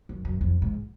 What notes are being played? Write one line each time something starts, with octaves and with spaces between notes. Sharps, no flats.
F#2
F#2
F2
G#2